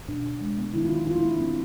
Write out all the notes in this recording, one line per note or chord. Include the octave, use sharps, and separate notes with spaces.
B2 D4
B2
G#3
B3
D#3 E4
F4
D#3
G3 F4
E4
A#3
D4
C3 C4